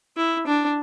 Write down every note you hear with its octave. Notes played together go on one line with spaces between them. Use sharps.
E4
D4